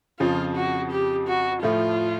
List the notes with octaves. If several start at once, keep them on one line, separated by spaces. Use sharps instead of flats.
F2 C#3 F3 F4
F#4
G4
F#4
A2 F3 A3 F4